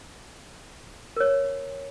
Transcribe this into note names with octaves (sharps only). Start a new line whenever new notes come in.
A#4 C#5